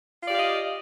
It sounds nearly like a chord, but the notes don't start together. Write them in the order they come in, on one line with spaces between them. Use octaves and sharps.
F4 D5 G4 F5 D#5